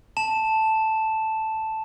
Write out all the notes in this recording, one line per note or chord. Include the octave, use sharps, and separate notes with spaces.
A5 E7